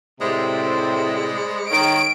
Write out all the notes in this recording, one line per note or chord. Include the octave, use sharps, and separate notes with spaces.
A2 C3 G#3 C5 D5 B5
D#3 C#5 D7